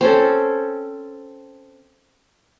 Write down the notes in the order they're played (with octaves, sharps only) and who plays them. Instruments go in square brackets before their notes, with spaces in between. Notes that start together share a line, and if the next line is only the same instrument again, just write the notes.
[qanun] C4 C#4 A4